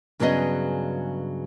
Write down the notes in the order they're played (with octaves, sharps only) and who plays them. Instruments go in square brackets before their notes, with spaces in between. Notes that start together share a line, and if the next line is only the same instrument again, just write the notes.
[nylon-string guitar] G2 C#3 F#3 B3 G#4 D#5